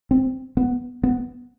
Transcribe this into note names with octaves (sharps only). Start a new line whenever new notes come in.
C4
B3
B3